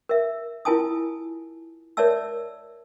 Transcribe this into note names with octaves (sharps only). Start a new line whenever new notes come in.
A#4 E5
E4 F4 A#4 G#5 A5 D#6
A#4 C#5 D5 E5 A5 E6